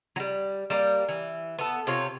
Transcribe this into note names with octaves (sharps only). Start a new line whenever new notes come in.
F#3 G3
G3 A#3
E3
B3 A4
C3 F4 C#5